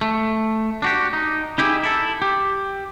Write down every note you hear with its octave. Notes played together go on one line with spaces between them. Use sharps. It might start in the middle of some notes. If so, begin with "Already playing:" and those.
A3
D4 F#4 G4
D#4
D#4 E4 G4 G#4
E4 A4
G4